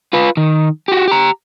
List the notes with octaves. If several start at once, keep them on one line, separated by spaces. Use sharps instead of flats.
F4 B4
D#3
F#4 G4
G4 A#5